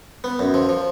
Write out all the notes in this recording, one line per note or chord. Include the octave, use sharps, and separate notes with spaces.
B3
F#2
F3
F3